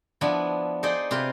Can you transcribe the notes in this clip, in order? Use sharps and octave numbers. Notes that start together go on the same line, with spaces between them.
F3 B3 D4 E4
D#4 G#4 C5 D5 D#5
C3 F4 B4 C5